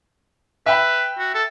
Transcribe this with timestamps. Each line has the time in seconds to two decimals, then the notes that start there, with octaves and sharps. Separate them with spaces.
0.66 B4 E5 G5 B5
1.19 F#4
1.34 A4